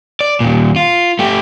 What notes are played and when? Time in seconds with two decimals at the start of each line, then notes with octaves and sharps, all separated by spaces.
0.21 D5
0.40 D#2 A#2
0.76 F4
1.19 A3 G4